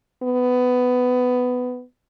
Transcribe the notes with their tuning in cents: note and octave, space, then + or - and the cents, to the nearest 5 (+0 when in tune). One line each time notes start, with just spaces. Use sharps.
B3 +15